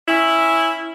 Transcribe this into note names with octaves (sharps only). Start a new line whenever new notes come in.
C#4 E4